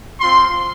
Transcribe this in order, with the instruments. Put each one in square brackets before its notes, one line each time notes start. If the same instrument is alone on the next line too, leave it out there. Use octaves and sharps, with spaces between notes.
[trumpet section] C4 F4 C6